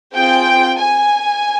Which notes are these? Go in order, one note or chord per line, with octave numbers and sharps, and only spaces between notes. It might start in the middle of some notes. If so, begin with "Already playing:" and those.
C4 F4 G#4 G5
G#5